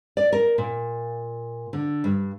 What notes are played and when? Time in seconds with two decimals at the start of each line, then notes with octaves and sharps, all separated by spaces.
0.17 D5
0.33 A#4
0.58 A#2
1.73 D3
2.04 G2